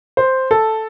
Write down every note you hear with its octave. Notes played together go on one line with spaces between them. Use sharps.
C5
A4